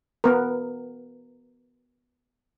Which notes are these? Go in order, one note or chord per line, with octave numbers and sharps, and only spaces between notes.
B3 A#4